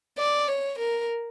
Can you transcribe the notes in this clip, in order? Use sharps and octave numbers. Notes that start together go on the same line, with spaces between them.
D5
C#5
A#4